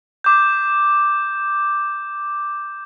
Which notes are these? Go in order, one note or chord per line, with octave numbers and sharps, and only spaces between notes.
D6 G6